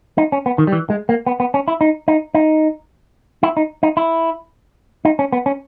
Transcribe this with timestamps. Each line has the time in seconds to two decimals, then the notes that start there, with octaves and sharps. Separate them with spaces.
0.18 D#4
0.32 C#4
0.46 B3
0.58 D#3
0.67 G3
0.73 E3
0.90 G#3
1.09 A#3
1.26 B3
1.40 B3
1.54 C#4
1.68 E4
1.81 D#4
2.08 D#4
2.34 D#4
3.43 E4
3.57 D#4
3.83 D#4
3.97 E4
5.05 D#4
5.19 C#4
5.32 B3
5.46 C#4